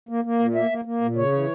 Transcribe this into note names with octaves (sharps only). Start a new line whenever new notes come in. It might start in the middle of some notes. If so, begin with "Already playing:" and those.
A#3
A#3
A#2
A#3 E5
A#3
A#3
A#2
C#3 C#5
E3